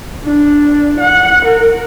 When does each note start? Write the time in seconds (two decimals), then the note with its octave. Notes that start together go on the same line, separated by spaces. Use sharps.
0.24 D4
1.00 F#5
1.45 A#4